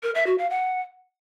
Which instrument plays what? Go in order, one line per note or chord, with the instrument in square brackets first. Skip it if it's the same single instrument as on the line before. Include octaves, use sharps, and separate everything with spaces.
[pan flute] A#4
E5
F#4
F5
F#5